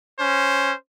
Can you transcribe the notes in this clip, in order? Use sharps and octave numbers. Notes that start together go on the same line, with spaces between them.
C#4 C5